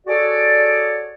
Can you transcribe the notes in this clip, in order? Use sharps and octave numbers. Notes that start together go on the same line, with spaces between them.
F#4 G#4 A4 C#5 D5